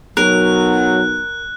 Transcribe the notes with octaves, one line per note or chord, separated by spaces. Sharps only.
B1 F#3 A#4 F#6